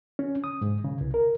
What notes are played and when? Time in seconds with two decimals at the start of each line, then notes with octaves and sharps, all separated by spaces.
0.19 C#4
0.44 D#6
0.61 G#2
0.84 C#3
1.01 C2
1.14 A#4